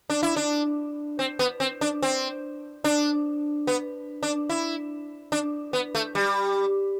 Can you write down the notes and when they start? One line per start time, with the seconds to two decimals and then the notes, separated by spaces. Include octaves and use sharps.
0.10 D4
0.23 E4
0.36 D4
1.19 C4
1.39 B3
1.60 C4
1.81 D4
2.02 C4
2.84 D4
3.67 B3
4.23 D4
4.49 E4
5.32 D4
5.73 B3
5.95 A3
6.15 G3